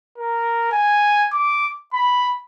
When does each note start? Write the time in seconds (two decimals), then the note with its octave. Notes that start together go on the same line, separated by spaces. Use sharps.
0.18 A#4
0.72 G#5
1.32 D6
1.93 B5